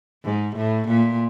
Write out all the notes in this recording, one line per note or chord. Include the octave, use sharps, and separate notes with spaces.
G#2
A2
A#2